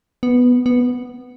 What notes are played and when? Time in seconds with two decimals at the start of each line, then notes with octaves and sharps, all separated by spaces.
0.23 B3
0.66 B3